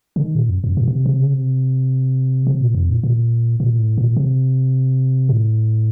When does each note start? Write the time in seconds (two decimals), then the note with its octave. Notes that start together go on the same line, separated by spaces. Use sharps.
0.16 C#3
0.21 D#3
0.35 A#2
0.49 F#2
0.64 F#2
0.77 A#2
0.88 A#2
0.92 C3
1.06 C3
1.20 C#3
1.33 C3
2.47 C3
2.61 A#2
2.75 F2
2.90 A#2
3.03 A#2
3.60 A#2
3.79 A2
3.98 A#2
4.16 C3
5.29 A2